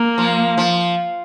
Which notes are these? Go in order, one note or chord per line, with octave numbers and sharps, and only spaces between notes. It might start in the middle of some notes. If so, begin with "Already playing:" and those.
Already playing: A#3
F3
F3